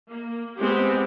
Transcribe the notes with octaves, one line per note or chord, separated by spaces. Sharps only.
A#3
G#3 B3 C4 G4